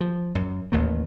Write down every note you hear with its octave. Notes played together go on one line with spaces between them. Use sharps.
F3
F#2
A1 D#2 A3 A#3